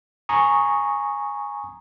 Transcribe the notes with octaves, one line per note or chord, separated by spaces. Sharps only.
G#5 A#5 C#6 D#6